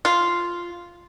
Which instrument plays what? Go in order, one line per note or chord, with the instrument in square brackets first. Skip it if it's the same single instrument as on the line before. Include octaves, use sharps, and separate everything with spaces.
[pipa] F4